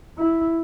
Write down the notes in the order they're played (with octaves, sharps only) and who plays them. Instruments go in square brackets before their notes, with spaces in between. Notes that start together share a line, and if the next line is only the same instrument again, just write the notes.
[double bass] E4